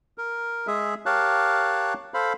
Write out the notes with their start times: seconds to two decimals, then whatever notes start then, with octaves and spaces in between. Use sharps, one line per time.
0.18 A#4
0.67 G#3 G#4 E5
1.06 G4 A#4 C#5 F5 A5 F#6
2.14 A4 C5 F5 B5